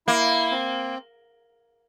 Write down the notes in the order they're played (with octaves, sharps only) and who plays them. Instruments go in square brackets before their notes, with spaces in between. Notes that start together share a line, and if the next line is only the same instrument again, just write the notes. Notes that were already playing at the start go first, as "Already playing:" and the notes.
[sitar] A#3 [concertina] E4
[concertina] C4